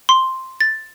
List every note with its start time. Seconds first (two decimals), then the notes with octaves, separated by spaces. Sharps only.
0.09 C6
0.61 A6